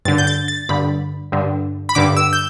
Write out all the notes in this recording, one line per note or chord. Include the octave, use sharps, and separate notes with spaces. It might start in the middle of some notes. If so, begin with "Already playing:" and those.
G2 D3 A6
G6
A6
A6
G2 D3 B5
G2 D3
B5
G2 D3 D6
E6
G6